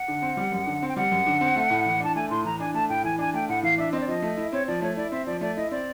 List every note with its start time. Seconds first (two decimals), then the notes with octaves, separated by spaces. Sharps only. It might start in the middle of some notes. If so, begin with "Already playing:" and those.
Already playing: F#5
0.08 D3
0.22 C4
0.37 G3
0.52 F#2
0.66 D3
0.82 C4
0.89 G5
0.97 G3 F#5
1.11 F#2
1.27 D3
1.41 C4
1.56 A3
1.70 A2
1.86 E3
2.00 D4 A5
2.16 A3 G#5
2.30 A2 C6
2.45 E3 A#5
2.60 D4 G#5
2.74 A3 A5
2.89 A2 G5
3.04 E3 G#5
3.19 D4 G#5
3.34 A3 G5
3.49 A2 F#5
3.63 E3 F5
3.78 D4 E5
3.93 C4 D#5
4.01 D5
4.08 F3 D#5
4.22 A3
4.37 E4
4.52 C4 C#5
4.67 F3 D5
4.82 A3 C#5
4.97 E4 D5
5.12 C4 E5
5.26 F3 D5
5.41 A3 D5
5.56 E4 D#5
5.71 C4 D5